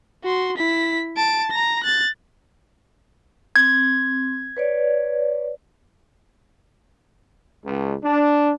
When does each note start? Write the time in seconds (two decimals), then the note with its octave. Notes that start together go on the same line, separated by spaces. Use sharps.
0.24 F#4 C6
0.57 E4 B6
1.17 A5 D7
1.51 A#5 A#6
1.84 F#6 A6
3.56 C4 G#6
4.57 B4 C#5 D5
7.66 C#2
8.03 D4